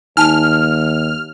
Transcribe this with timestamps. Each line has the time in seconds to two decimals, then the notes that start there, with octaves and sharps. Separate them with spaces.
0.17 D#2 D#4 G#5 A5 F6